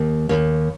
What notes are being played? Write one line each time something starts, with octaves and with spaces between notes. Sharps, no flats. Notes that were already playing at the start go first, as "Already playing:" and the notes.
Already playing: D#2
D#2 C#5